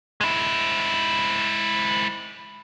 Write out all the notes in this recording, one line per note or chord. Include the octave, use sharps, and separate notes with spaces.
G#3 E4